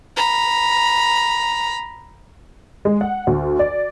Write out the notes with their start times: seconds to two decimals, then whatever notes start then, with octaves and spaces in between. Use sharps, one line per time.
0.16 A#5 B5
2.85 G#3
3.01 F#5
3.27 D2
3.59 D5